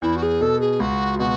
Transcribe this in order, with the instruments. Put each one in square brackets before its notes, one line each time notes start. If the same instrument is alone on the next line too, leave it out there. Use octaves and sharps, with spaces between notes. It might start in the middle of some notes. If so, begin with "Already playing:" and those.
[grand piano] E2 [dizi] E4
[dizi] F#4
G#4
[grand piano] B2 [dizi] A4
[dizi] G#4
[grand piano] C#2 [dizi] F#4
[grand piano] B2 [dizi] F#4